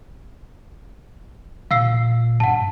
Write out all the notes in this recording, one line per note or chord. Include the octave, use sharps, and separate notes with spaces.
A#2 F5 E6 C7
G2 F#5 A5